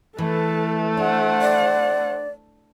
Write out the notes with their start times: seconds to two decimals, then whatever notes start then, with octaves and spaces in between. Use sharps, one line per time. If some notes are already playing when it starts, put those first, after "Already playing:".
0.18 E3 A3 A4 B4
0.97 D4 C5 F#5
1.42 D5